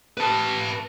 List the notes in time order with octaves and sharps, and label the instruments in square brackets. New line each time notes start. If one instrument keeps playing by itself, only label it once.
[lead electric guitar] B4 A5